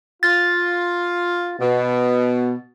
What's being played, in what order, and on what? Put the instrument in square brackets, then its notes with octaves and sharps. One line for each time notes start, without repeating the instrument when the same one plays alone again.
[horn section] F4 [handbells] A6
[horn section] B2